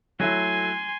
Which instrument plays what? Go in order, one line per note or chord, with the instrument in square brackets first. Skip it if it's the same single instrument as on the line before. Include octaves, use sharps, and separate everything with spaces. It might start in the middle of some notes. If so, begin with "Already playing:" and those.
[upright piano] F#3 A3 E4 [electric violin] G#5 C6